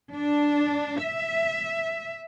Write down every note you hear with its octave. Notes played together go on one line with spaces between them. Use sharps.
D4
E5